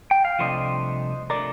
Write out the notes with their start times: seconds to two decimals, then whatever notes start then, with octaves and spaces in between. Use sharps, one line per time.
0.11 G5
0.25 F5
0.39 C2 C3 F3 A3 D4 C5 D#5
1.30 C3 F3 A3 D4 A#4 D5